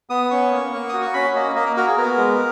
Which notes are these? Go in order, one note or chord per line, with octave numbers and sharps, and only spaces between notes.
B3 D#6
C#4 C#6
A#3
A#3
F#4 D#6
C#6
C#4 B5
A#3 D#5
A#3 D#5
A#4
F#4 A#4
G#4
B3 A#4
G#3